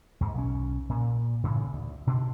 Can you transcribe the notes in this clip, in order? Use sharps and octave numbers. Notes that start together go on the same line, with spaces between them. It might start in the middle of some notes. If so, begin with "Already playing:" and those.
D#2 G#2
B1 C#4
A#2
A2 C#3 E3
D2
B2 D4